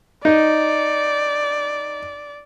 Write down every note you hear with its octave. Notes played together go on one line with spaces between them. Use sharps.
D#4 D5